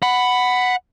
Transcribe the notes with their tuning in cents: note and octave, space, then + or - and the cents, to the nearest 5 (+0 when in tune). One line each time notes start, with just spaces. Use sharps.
F#5 +0 B5 +10